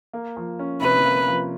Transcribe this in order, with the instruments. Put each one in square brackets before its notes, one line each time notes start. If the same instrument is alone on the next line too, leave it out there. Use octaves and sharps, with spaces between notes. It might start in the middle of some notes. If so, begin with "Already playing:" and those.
[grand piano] A#3
F3
C#4
[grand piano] C3 [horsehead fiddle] B4
[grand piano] A#3
F3